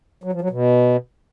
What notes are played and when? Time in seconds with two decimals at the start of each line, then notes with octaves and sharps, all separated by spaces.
0.24 F#3
0.32 F3
0.41 F#3
0.50 B2